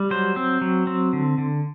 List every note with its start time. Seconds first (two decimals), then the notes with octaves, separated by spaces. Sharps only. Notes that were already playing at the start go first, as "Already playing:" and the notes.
Already playing: G3
0.10 F#3 C5
0.36 C4
0.61 F#3
0.87 C4
1.13 D3
1.38 D3